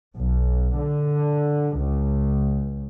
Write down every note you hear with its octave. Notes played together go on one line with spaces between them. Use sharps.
B1
D3
C#2